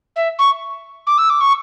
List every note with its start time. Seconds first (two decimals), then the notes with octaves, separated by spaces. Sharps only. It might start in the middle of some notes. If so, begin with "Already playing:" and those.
0.16 E5
0.39 C#6
1.07 D6
1.18 E6
1.30 D6
1.41 C#6